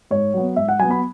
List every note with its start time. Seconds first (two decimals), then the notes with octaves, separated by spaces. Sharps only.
0.11 G#2 C#5
0.34 F#3 B3
0.56 G#2 E5
0.68 F#5
0.79 F#3 B3 G#5
0.90 B5